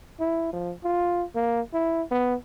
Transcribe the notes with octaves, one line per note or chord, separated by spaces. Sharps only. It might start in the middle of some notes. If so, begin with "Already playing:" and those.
E4
F3
F4
A#3
E4
B3